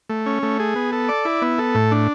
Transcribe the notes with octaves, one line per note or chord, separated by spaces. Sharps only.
A3
C#4
A3
G#4
B3
A4
D5
E4
B3
A4
A2
D4